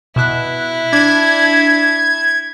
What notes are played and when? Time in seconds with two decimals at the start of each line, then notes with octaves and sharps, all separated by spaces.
0.16 B2 E4 E5 F#6
0.93 D4 G#6